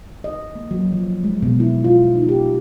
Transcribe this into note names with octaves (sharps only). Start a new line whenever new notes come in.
D#5
A#3
F#3
F3
G#3
B2
E4
F4
D#4
G4